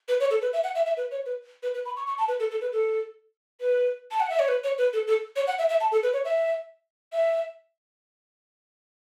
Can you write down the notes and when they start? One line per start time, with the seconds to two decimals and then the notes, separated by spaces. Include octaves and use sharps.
0.08 B4
0.20 C#5
0.31 A4
0.42 B4
0.53 E5
0.64 F#5
0.75 E5
0.86 E5
0.97 B4
1.11 C#5
1.26 B4
1.63 B4
1.74 B4
1.85 B5
1.96 C#6
2.07 C#6
2.18 A5
2.28 B4
2.40 A4
2.51 A4
2.61 B4
2.73 A4
3.61 B4
4.11 A5
4.20 F#5
4.30 E5
4.39 C#5
4.48 B4
4.64 C#5
4.78 B4
4.93 A4
5.07 A4
5.36 C#5
5.47 F#5
5.59 E5
5.69 E5
5.81 A5
5.92 A4
6.03 B4
6.13 C#5
6.25 E5
7.13 E5